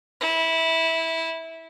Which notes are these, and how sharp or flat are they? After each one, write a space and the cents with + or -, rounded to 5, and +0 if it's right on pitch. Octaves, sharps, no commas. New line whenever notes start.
E4 -15